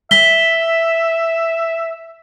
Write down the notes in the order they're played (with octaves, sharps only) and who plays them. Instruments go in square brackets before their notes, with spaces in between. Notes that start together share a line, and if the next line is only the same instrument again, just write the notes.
[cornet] E5 [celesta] B6 G7